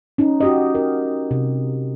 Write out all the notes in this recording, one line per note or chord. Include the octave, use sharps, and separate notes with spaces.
C#4 D#4
F#4 G4 D#5
A#4
C3